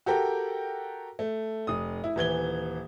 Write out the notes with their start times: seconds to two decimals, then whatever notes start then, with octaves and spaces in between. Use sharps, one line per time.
0.06 F#4 G4 A4 A#4 G5
1.19 A3
1.67 F1 D#6
2.04 E4
2.16 D#1 E3 G#6 G7